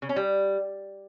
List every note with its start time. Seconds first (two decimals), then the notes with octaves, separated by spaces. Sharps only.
0.02 C#3
0.09 C#4
0.16 G3